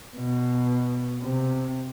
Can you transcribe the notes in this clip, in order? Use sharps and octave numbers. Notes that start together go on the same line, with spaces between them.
B2
C3